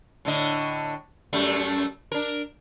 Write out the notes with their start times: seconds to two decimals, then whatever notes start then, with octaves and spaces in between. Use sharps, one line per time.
0.25 A2 D3 D#5
1.33 F#2 G3 A3
2.12 D4 A#4